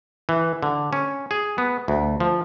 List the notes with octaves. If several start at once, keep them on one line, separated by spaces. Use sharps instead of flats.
E3
D3
C#4
G#4
B3
D2
F3